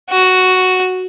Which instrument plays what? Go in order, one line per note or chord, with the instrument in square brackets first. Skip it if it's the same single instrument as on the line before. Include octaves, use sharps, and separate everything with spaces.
[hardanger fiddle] F#4